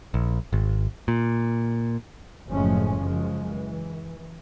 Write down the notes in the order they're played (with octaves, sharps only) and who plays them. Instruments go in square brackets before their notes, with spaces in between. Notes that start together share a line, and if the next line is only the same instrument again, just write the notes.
[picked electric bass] A#1
G#1
A#2
[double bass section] F#1 A2 F3 G#3 A3 C#4
F#2 C#3 F3 G#3
E3